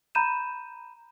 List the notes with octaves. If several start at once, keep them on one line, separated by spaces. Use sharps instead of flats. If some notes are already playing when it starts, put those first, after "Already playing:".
A#5 B5 G6 D#7 E7